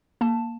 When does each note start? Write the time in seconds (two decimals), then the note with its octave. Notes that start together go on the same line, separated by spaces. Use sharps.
0.21 A#3 A5